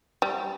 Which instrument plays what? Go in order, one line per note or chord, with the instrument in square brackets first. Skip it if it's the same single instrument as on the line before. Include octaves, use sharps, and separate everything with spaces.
[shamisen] G3